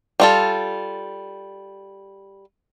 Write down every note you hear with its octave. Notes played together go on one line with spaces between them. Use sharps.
G3 F4 A4